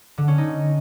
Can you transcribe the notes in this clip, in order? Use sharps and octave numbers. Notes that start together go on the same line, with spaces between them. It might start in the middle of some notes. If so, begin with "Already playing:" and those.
D3
C#4
D#4